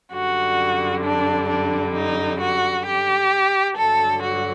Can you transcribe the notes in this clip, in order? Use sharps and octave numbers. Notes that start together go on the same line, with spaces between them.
F#2 D3 G3 F#4
D4
D4
D#4
F#4
G4
G2 D3 F#3 A4
F#4